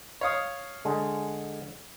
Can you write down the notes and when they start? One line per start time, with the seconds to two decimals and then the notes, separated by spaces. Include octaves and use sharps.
0.21 C#5 F5 D#6
0.85 D3 G#3